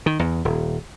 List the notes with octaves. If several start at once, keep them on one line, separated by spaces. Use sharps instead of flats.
D#3
E2
D#1